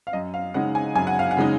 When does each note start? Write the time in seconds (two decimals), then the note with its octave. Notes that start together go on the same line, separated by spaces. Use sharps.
0.07 F5
0.13 F#2 D#5
0.34 F5
0.54 C#3 G#3 D#4 F#5
0.75 G#5
0.95 F#2 G#5
1.07 F#5
1.19 F5
1.31 F#5
1.37 C#3 G#3 D#4